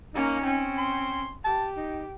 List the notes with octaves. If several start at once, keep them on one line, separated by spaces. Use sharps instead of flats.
A#3 C#4 D#4
C4 C#4
C6
G4 A5
D#4